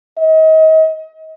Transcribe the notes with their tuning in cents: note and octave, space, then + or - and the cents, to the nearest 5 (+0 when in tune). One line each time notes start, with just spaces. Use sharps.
D#5 +35